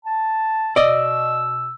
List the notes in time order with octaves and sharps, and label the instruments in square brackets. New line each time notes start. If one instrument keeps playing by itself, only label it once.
[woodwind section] A5
[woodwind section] B2 E6 [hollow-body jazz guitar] D5 D#5